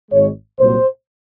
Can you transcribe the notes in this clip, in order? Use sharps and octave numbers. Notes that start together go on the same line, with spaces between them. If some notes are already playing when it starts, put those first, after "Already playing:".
G#1 G#2 D#3 G#3 C#5
C2 A#2 F#3 C5